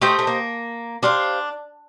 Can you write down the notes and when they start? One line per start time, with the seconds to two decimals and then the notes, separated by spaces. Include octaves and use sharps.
0.02 A3 G4 C5 D#5 G5
0.19 A3
0.27 A#3
1.02 D4 G4 C5 F5 C6